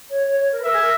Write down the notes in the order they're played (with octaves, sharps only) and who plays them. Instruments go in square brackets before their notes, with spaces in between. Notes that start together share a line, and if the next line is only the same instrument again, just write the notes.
[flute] C#5
C#5
C#5
A#4
B4
[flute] A#4 [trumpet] E5
[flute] G#4
A#4